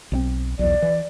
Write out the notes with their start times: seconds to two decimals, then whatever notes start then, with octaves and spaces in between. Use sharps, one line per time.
0.12 B1 G3 C4
0.59 B1 E2 D5
0.82 E3